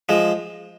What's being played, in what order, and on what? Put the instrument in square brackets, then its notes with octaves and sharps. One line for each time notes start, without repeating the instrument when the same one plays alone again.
[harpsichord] F3 G#3